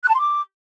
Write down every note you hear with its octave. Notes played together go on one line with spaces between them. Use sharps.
F#6
A5
C6
D6